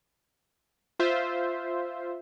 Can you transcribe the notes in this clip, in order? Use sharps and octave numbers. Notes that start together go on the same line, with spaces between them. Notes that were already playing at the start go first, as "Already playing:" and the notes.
F4 C5 E5